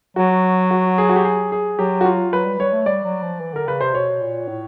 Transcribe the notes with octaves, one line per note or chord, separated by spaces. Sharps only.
F#3 F#4
F#4
G#4
F#4
G4
G#4
G#4
F#3 G4
F#4
F4
F#3 B4
G3
G3 C#5
A3
G3 D5
F#3
F3
E3
D3 A#4
C#3 B4
C3 C5
B2 C#5
A#2
A2